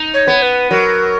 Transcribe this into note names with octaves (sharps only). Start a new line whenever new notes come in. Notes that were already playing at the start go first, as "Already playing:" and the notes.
Already playing: D#4
C#5
B3
B4
F#3 A#4